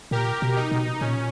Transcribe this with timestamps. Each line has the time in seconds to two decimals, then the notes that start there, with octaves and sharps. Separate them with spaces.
0.11 A#2 G4 A#4
0.42 B2
0.56 D#4
0.71 B2
1.01 A#2 C#4